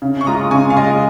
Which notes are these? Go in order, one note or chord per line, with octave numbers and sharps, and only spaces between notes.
C#3
C#6
G#3 F4 A#5 D#6
C#3 G#5 C#6
F5
G#3 F4 D#5 G#5